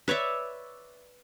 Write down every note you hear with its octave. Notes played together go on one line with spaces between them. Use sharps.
B4 C#5 D5 E5